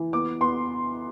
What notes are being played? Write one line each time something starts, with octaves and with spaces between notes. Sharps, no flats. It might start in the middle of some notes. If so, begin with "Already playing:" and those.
Already playing: E3
B3 D6
B3 C6